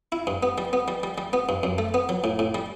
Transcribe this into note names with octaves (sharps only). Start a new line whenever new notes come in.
E4
G2
B3
G3
B3
G3
G3
G3
B3
G2
F#2
A3
B3
F#3
A2
A2
G3